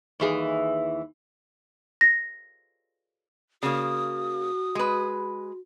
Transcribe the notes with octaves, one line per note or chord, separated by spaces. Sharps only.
D#2 E3 G#4
A#6
C#3 A#3 F#4 D#6
G#3 B4